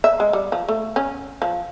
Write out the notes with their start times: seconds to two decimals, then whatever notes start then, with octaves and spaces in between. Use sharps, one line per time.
0.04 E5
0.20 G#3
0.33 G3
0.52 F3
0.69 A3
0.96 C#4
1.42 F3